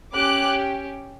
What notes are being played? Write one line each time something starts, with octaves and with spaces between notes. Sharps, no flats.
C#4 G4 D6 F#6